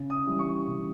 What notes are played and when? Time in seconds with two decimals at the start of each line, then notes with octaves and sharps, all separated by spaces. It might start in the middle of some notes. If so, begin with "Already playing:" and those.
Already playing: C#3
0.10 D#6
0.25 E3 G3
0.39 C#6
0.68 C#3